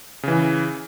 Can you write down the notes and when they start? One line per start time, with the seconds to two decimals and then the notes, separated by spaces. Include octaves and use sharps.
0.23 C#3 E3